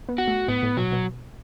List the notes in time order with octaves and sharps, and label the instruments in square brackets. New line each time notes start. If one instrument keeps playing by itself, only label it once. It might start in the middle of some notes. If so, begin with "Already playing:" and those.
[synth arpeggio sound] B3
[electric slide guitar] F#4
[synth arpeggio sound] A3
[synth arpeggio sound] A2 [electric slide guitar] B3
[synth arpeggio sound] A2
[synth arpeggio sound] B2 [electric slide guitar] F#3
[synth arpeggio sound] B2